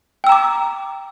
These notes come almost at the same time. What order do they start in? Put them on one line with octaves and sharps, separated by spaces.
G5 E6 A#5 D6